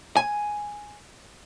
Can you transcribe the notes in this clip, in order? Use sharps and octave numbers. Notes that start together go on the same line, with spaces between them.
G#5